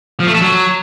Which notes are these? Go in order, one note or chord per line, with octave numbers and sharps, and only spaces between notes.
F3
A3
A4
F#3